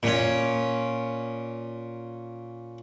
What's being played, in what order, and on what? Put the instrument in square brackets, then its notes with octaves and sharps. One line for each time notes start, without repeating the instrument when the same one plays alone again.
[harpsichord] A#2 C#4